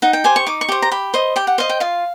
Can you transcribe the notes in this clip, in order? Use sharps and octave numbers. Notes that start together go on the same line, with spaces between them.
D#4 F#5
G5
G4 C5 G#5
C#6
D#4 D6
C#6
G4 C5
A#5
G4 B5
C5 D#5
G4 G5
F#5
C5 D#5 F5
G5
F4 F5